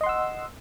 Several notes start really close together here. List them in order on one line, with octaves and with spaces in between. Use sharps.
D#5 C6 F#5 E6